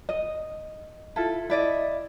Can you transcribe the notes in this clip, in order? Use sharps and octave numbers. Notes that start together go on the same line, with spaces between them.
D#5
E4 F4 A4
E4 D5 D#5